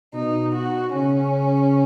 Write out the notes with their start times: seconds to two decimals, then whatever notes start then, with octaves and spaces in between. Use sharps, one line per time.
0.14 B2 D#4
0.54 F#4
0.93 C#3 C#4